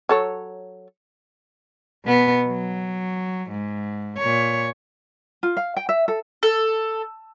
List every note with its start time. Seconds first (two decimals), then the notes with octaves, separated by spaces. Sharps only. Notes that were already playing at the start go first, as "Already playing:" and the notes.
0.09 F#3 A4 C#5
2.05 B2 B3
2.47 F#3
3.51 G#2
4.18 A#2 C#5
5.43 F4
5.57 F5
5.76 G5
5.89 E5
6.08 A4
6.43 A4